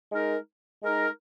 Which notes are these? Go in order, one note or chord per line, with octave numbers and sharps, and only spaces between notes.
G#3 D#4 A#4
G#3 D#4 A#4